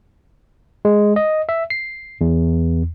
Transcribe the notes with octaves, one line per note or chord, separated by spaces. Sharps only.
G#3
D#5
E5
C7
E2